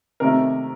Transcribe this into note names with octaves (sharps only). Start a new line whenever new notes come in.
C3 D#3 A3 A#4